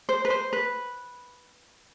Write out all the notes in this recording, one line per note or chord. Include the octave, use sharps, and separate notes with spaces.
C5
B4
C5
B4